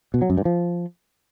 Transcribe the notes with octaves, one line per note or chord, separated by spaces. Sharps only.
B2
F#3
F#2
G2
F3